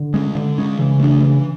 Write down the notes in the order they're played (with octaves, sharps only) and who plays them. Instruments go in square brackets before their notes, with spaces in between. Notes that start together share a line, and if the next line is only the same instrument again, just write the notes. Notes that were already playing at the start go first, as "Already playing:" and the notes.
Already playing: [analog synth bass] D3
[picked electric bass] G#3 C#4
D3
G#3 C#4
[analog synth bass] C#3 [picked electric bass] E3
[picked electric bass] A3 D4
E3